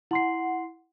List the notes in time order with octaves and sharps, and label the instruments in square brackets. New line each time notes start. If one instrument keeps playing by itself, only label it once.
[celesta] E4 C6 C7 [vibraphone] F#5